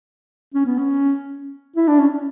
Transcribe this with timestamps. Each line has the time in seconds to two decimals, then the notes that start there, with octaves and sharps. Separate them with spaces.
0.54 C#4
0.66 B3
0.79 C#4
1.76 E4
1.88 D4
1.99 C#4